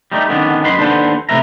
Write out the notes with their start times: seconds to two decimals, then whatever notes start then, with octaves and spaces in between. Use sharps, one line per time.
0.12 G3 A3 D#4
0.29 D3 D#3 B3 C#4 D4
0.64 F#2 B4 D#5 B5 C6
0.78 D#2 D4 A4 B4 C5 F#5
1.29 C3 E3 A3 B4 E5 A#5